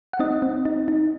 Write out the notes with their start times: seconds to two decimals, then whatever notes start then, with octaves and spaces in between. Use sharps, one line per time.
0.13 F#5
0.19 C4 D#4 D#5
0.42 C4
0.65 D#4
0.88 D#4